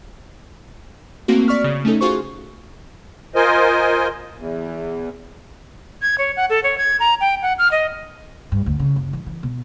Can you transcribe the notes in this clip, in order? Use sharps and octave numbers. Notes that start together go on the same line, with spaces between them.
A3 A#3 C4 F#4
D5 C#6 F6 B6
C#3
A3 C#4 D#4 A4
F4 F#4 G#4 C5 C#6
F4 A#4 C5 D#5 G#5
E2
G#6
C#5
F#5
A4
C#5
G#6
A#5
G5
F#5
F6
D#5
G2
D2
C#3
F#1
E3
E3
B2